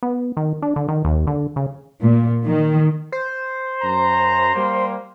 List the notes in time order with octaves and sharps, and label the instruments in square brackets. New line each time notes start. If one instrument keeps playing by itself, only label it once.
[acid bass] B3
D#3
D4
D3
D#3
D#2
D3
C#3
[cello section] A#2
D#3
[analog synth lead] C5
[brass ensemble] F#2 A#5
G3 A#3